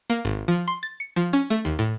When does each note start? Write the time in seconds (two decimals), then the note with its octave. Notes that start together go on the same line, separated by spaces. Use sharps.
0.10 A#3
0.25 G#1
0.48 F3
0.68 C6
0.83 A6
1.00 C#7
1.16 F3
1.33 C#4
1.50 A3
1.65 D#2
1.79 A2